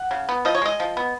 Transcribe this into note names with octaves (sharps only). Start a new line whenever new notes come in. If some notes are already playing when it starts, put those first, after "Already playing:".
Already playing: F#5
C#3
B3
F3 D#5
C#5
G#3 D#5
F3
B3